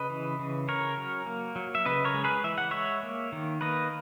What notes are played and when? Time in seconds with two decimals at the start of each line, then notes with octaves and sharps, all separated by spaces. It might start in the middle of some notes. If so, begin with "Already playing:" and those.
Already playing: C#3 B4 D#5
0.10 E3
0.39 C#3
0.68 C#4 A#4 C#5
0.97 F#3
1.26 A#3
1.56 F#3
1.75 E5
1.85 C#3 B4 D#5
2.04 A#4 C#5
2.14 G#3
2.24 G#4 B4
2.44 E3 E5
2.58 F#5
2.71 G#3 C#5 E5
3.03 A#3
3.32 D#3
3.61 A#3 B4 D#5